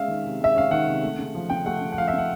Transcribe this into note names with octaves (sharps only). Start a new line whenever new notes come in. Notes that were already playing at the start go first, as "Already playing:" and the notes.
Already playing: G#3 C#4 E5 F5
D#3
C3
G#3 E5
C#4 F5
D#3 F#5
C3
A3
C#3
F3
C#3 G5
A3 F#5
C#3
F#5
F3 F5
E5
C#3 F#5